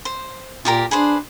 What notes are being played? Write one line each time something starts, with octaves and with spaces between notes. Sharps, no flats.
C5
A#2 F4 G4 A#4
D4 G#4 B4 C5